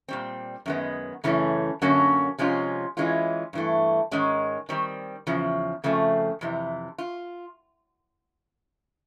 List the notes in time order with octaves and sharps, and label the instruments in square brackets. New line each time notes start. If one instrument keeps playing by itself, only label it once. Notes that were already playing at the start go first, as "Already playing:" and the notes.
[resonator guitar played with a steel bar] A#2 G3 C4
F#2 D#3 G#3 B3
F#2 C#3 E3 A3 C#4
F#2 D3 F#3 A#3 C#4
C3 F3 G#3 C#4 F4
E3 G#3 C#4 F4
G2 E3 A3
G#2 D#3 G#3 C#4
D#3 G3 C4
E2 C#3 F3
F2 C#3 F3 A3
F2 C3 E3
F4